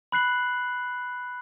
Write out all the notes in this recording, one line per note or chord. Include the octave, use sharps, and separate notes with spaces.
B5 F#6 C7 F#7